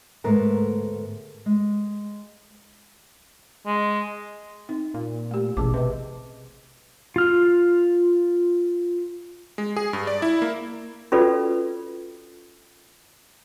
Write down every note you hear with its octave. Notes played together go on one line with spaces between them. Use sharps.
D2 G#2 A3 B3 A#4 A5
G#3
G#3
C4 D#4
A#2
A3 G4
A1 B2 C#4 G#4 A5 D6
C3 B4 D#5
F4 F6
G#3
G#4
G2
D5
E4
A#3
C#4 F4 F#4 A4 B4 D5